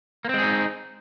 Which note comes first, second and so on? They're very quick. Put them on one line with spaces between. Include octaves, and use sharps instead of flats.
A#3 C4 G#3 G#4 D#4